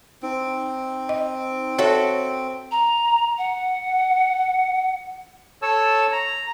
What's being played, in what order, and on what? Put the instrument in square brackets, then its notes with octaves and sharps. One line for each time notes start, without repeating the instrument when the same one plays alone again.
[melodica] C4 [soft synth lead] D#4
[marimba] D#5
[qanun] F#4 A4 E5 [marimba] C#5
[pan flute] A#5
F#5
[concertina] A4 C#5 A5 E6
A#5